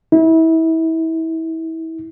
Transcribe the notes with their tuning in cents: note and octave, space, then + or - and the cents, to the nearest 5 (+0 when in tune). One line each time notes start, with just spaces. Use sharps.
E4 -30